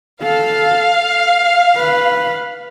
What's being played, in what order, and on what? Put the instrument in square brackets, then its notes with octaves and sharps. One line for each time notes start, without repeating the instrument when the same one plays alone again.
[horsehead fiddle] A4 [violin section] F5
[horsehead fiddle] B4